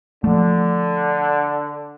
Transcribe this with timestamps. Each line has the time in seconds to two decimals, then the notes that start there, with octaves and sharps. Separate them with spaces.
0.24 D3 F3 A3